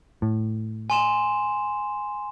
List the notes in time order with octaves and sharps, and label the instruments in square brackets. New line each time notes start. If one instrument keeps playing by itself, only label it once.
[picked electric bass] A2
[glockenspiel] G#5 C6 E7